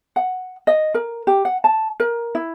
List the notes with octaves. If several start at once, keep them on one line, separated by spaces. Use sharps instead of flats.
F#5
D#5
A#4
G4
F#5
A5
A#4
E4